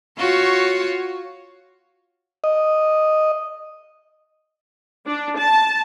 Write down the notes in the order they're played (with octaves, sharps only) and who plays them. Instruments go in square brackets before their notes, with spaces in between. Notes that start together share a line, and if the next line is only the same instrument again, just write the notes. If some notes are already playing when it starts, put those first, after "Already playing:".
[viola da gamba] F4 F#4 C#5
[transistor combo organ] D#5
[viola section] D4
A5